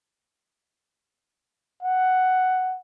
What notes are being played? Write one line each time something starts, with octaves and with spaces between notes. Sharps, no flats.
F#5